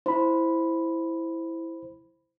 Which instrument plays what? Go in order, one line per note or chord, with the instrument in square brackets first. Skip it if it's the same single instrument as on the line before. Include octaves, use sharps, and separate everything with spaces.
[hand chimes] E4 [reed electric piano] C5 B5